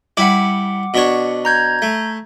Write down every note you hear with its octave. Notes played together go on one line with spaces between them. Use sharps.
G3 E4 F#5 D6
B2 D4 C#5
A#5 G6 G#6
A3